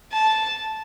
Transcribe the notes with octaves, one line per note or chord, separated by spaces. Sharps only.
A5